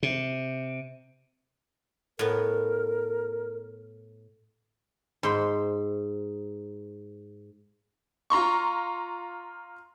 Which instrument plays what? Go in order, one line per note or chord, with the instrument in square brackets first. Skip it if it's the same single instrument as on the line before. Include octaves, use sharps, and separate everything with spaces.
[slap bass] C3
[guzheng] A2 B3 [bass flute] A#4
[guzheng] G#2 C5 B5
[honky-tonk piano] F4 A#5 C6 C#6